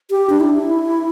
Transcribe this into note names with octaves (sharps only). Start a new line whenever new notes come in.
G4
D4
E4